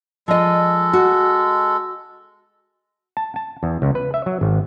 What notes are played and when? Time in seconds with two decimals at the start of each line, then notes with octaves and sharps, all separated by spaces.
0.28 F3 G#3 A4 D#5
0.93 F#4
3.17 A5
3.36 A5
3.63 E2
3.82 C#2
3.95 B4
4.14 E5
4.26 F#3
4.41 G#1